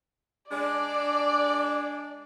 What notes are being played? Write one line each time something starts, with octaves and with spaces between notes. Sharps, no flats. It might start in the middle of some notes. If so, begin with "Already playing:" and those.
G#3 D4 D5